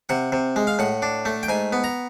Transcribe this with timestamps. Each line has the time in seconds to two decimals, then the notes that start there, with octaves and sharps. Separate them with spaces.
0.09 C3 F#5
0.32 C3
0.56 G#3
0.67 F5
0.79 A2 F#5
1.02 D4
1.25 A3
1.43 G5
1.49 G#2 G#5
1.73 B3
1.84 A#5